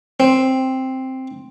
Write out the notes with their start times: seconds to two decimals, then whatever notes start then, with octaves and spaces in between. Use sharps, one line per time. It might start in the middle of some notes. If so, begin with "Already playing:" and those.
0.20 C4